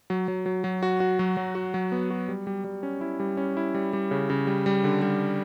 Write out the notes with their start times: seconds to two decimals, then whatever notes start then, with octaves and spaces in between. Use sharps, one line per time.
0.10 F#3
0.28 F#3
0.46 F#3
0.64 F#3
0.83 F#4
1.00 F#4
1.19 F#3
1.37 F#3
1.55 F#4
1.74 F#3
1.92 B3
2.11 F#4
2.28 G3
2.47 G3
2.64 G3
2.83 C#4
3.01 E4
3.20 G3
3.37 C#4
3.57 E4
3.74 G3
3.93 G3
4.11 C#3
4.30 C#3
4.47 G3
4.66 G3
4.84 D3
5.02 G3